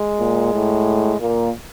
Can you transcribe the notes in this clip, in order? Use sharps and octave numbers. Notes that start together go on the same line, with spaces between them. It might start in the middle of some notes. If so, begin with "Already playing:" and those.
Already playing: G#3
A#2
A2
A#2 A#3